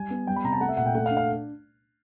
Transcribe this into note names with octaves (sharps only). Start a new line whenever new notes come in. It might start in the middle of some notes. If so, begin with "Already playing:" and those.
Already playing: G3 G#5
B3
G3 G5
B5
C3 A#5
A5
A3 F#5
E5
A#2 F#5
G5
A3 F#5
F5
D4
F5